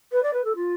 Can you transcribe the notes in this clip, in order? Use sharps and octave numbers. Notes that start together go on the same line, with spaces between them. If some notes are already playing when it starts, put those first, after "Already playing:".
B4
D5
B4
A4
F4